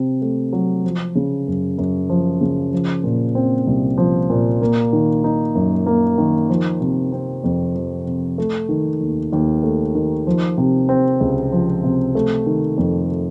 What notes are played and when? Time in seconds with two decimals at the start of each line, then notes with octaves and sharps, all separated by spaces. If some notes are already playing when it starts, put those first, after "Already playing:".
Already playing: C3 C4
0.22 A3
0.53 F#3
0.85 F3
1.15 C#3
1.47 F#2
1.78 F#2
2.09 F3
2.41 C#3
2.73 F3
3.04 A#2
3.35 C4
3.67 C2
3.98 F3
4.30 A#2
4.61 A#3
4.93 D#3
5.24 D#4
5.55 F#2
5.86 A#3
6.18 D#3
6.49 F3
6.81 C3
7.12 C4
7.44 F2
7.75 F3
8.07 C3
8.38 A3
8.69 D#3
9.01 D#2
9.33 D#2
9.63 A3
9.95 D#3
10.27 F3
10.58 C3
10.89 C4
11.20 C#2
11.52 F3
11.84 C3
12.15 A3
12.46 D#3
12.77 F2